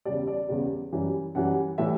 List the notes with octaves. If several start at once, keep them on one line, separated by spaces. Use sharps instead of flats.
E2 C#3 G3 D5
D5
E2 C#3 G3
F#2 E3 G3
F#2 E3 G3 F#5
A2 E3 G3 E5